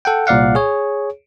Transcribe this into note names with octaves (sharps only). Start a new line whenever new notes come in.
A4 F#5 G5
C2 A#2 D5 F5 F#5
G#4 C#5